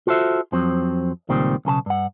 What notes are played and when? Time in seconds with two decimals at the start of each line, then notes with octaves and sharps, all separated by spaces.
0.07 F4 F#4 A4 C5 E5
0.52 F2 F3 F#3 C4
1.29 C#2 A#2 D#3 G3 C4
1.65 B1 C#3 A4 A5
1.86 G2 F#5